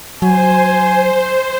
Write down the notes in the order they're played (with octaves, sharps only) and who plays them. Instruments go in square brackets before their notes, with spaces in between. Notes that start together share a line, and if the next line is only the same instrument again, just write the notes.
[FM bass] F#3 [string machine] C5 [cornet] G#5